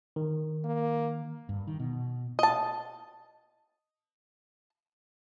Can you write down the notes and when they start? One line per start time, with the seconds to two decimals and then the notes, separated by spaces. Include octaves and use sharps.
0.16 D#3
0.64 A#3
1.49 G2
1.67 D#3
1.79 B2
2.39 D#5 A5